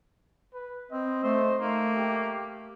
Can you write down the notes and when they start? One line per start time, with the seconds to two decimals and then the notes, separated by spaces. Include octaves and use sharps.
0.54 B4
0.91 C4 D#5
1.23 A3 C5
1.60 A3 A#3 D#4
1.96 G4